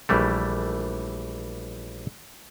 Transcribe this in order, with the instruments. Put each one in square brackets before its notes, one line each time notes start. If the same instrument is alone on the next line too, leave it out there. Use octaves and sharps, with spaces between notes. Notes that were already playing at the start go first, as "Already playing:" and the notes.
[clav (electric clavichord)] A#1 E3 G3 A3